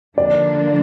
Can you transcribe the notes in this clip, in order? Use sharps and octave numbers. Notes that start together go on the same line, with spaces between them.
D3 F3 A#3 D4 D5